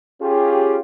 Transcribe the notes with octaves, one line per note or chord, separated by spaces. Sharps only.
C#4 F4 G4 G#4